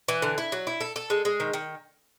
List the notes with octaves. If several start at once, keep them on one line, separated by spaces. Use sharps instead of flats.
E3
D3
E4
F#3
E4
A4
A4
G#3
G#3
D#3
D#3